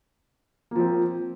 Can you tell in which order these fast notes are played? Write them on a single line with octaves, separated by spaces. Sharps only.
A#3 F3 C4